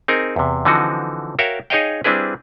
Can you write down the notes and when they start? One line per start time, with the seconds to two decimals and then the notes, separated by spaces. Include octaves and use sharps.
0.08 C4 D#4 G#4 A#4
0.36 E2 C3
0.65 D3 E3 F3 C4 D#4 F#4
1.39 F#4 A#4 C#5 E5 F5 G5
1.70 D#4 G#4 C#5 D#5 F5 G5
2.04 G3 C4 D4 E4 G#4 B4